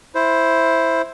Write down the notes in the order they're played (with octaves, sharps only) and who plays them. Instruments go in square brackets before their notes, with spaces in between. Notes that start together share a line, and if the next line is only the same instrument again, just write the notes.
[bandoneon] E4 C5